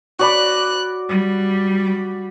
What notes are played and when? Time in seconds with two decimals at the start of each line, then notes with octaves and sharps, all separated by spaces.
0.19 F#4 D5 B5 F#6
1.10 G3